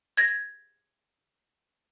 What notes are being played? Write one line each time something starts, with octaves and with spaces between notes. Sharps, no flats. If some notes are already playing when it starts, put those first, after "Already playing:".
G#6 A#6